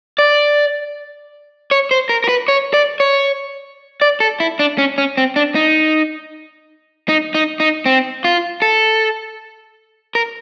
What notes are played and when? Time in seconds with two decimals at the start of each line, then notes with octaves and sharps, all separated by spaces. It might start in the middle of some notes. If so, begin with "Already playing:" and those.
0.19 D5
1.71 C#5
1.91 C5
2.09 A#4
2.24 A#4
2.29 B4
2.48 C#5
2.74 D5
3.00 C#5
4.02 D5
4.20 A4
4.40 E4
4.59 D4
4.78 C#4
4.98 C#4
5.17 C4
5.36 D4
5.55 D#4
7.09 D#4
7.34 D#4
7.60 D#4
7.86 C4
8.24 F4
8.62 A4
10.15 A#4